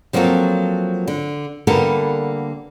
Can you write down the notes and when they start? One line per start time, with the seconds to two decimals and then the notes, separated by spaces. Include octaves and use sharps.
0.13 F3 F#3 A#3 C4 F#4 A4
1.08 D3
1.67 D3 G3 A#3 B3 A4 A#4